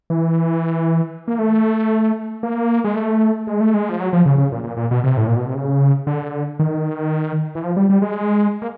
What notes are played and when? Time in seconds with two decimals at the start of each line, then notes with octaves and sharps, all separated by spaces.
0.10 E3
1.28 A#3
1.39 A3
2.43 A#3
2.84 G#3
2.95 A3
3.47 G#3
3.61 A3
3.74 G#3
3.89 F3
4.00 F#3
4.13 F3
4.26 C#3
4.38 C#3
4.52 A#2
4.64 A#2
4.77 A#2
4.91 B2
5.04 C3
5.17 A2
5.27 A#2
5.36 B2
5.46 C3
5.55 C#3
6.07 D3
6.59 D#3
7.55 E3
7.64 F3
7.77 G3
7.89 G3
8.02 G#3
8.62 A#3